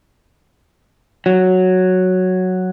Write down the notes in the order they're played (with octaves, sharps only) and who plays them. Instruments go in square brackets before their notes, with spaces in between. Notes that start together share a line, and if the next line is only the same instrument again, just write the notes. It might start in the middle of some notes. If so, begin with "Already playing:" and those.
[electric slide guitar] F#3